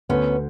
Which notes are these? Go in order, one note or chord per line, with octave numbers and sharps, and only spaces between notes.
D2 B3 C#4